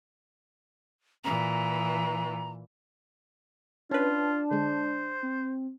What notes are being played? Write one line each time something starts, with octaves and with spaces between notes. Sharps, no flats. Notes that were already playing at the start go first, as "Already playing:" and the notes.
A#2 E3 A#5
C#4 D4 F4 B4 A5
D3 G#3 C5
C4